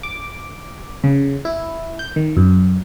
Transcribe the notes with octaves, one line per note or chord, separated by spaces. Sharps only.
D6
C#3
E4
G6
D#3
F#2